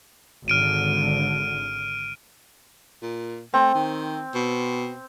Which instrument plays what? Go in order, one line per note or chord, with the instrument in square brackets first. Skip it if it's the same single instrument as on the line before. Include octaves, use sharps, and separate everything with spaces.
[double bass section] G#1 D3 [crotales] F6 D7 D#7
[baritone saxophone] A#2
[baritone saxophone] A3 [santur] C4
[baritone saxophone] D#3
B2